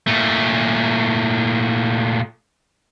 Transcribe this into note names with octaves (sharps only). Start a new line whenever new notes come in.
A#2 A3